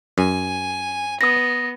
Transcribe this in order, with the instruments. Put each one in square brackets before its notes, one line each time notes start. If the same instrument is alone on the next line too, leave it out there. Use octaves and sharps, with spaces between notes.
[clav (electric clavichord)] F#2 [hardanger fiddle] G#5
[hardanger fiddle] B3 [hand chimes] D#6 A#6